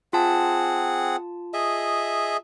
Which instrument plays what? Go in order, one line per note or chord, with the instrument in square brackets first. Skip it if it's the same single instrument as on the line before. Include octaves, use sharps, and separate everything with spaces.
[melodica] C4 G#4 F#5 [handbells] F4 A5
[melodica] G#4 D#5 E5